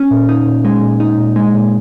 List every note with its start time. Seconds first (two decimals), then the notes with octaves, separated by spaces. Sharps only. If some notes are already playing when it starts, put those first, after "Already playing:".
Already playing: C#4
0.11 A#2
0.29 D#4
0.47 A#2
0.65 G#3
0.82 A#2
1.00 D#4
1.18 A#2
1.36 G#3
1.54 A#2